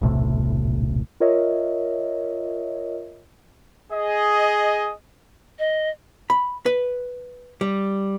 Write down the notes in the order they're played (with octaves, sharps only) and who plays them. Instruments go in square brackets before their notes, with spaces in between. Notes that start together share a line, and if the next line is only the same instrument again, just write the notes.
[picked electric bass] D#1 B1 A2 C3
[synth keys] F4 A#4 C#5 D#5 E5
[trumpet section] G#4 D#5
[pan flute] D#5
[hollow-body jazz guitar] B5
B4
G3